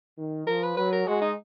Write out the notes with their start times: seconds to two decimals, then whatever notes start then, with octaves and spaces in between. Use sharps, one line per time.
0.18 D#3
0.47 F3 A#4
0.63 B4
0.77 F#3 B4
0.92 A#4
1.07 G#3 F#4
1.21 D#4